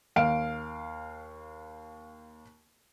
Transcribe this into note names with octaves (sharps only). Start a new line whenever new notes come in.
D#2 F5 D7